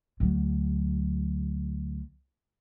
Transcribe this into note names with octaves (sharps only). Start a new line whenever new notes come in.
D2 F#3